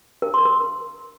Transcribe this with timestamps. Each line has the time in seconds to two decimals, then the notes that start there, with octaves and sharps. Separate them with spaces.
0.22 A#4
0.34 C6
0.45 A#4